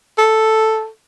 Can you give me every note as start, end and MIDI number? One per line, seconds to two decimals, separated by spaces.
0.18 0.88 69